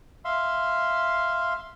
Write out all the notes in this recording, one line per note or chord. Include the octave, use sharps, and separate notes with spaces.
E5 F5 C6